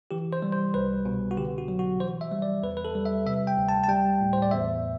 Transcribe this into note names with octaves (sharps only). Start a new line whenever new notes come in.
E3 G4
C5
G3
C5
C2 B4
B2
F#4
D3 G4
F#4
F#3
F#4
E3 C5
E5
G3
D5
E2 B4
B4
A4
G3
E5
C3 E5
G5
D2
A5
A5
G3 G5
A2
C5
D5
E2 E5